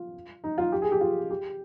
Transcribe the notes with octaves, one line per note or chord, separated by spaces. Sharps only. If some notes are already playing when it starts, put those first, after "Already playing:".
Already playing: F4
D#4
F4
G4
G#4
G4
F4
G4